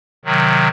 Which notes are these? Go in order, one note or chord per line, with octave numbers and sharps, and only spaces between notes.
C3 D#3 F#3